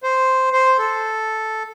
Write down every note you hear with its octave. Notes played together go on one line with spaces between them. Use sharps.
C5
C5
A4